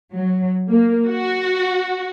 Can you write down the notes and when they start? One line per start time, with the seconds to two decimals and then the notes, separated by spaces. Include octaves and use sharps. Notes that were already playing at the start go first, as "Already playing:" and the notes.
0.12 F#3
0.69 A#3
1.08 F#4